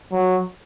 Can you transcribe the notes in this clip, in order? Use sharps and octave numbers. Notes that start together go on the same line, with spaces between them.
F#3